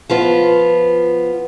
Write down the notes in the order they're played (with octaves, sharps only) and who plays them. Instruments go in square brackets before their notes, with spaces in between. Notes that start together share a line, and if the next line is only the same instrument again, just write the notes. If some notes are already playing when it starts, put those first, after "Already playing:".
[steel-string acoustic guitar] F3 B3 F4